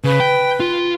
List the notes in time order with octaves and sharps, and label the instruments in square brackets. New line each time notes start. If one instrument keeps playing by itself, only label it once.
[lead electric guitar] C#3 [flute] B4
[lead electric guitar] G5
F4